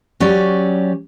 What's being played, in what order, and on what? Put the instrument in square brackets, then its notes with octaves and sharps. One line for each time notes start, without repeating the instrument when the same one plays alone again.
[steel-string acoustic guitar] F#3 C#4 G4 D5